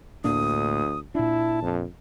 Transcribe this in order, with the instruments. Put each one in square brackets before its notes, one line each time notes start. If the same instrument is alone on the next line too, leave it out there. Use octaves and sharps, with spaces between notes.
[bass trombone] D2 [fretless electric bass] A2 A#3 D4 [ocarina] D#6
[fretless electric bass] A#2 D4 [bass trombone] E4 [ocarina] A5
[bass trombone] F2